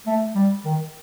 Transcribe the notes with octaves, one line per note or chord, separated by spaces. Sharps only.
A3
G3
D#3